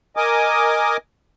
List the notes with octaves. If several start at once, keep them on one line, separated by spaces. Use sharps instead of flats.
A#4 D#5 G#5 D6 D#6